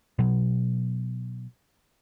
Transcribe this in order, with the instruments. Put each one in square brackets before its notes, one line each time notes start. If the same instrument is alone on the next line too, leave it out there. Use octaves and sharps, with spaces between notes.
[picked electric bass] B2 F#3